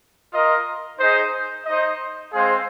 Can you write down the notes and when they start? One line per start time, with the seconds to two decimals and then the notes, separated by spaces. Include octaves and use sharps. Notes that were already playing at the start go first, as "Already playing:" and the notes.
0.32 F4 A#4 D#5
0.99 D#4 G#4 C5 D#5
1.66 D#4 C5 D#5
2.33 G#3 C4 G#4 C5 F5